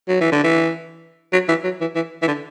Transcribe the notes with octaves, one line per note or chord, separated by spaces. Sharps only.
F#3
E3
D3
E3
F#3
E3
F#3
E3
E3
E3
D3